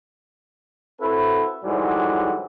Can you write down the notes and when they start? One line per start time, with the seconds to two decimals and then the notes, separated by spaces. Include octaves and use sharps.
1.00 C4 E4 F#4 A4 B4
1.64 G#2 D3 E3 F#3 G3